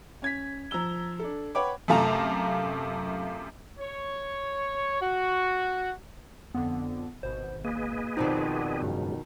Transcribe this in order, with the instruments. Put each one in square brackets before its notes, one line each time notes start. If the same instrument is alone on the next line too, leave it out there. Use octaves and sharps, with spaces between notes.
[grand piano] C#4 G#6 B6
F3 A#5 E6 G7
D4 A4
B4 C#5 F#5 G5 B5 D6
[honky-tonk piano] F#2 C3 A3 F4 A5 A#5
[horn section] C#5
F#4
[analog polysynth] F2 D3 [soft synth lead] B3
[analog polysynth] G#1 B2 [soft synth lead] C5
[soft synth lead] A#3 [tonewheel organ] G#4 B4 D#5
[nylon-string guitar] F2 B2 D#3 [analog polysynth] C4 F#4 D5 [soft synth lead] D#4
[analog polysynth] G2 [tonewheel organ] C#3 F#3 G#3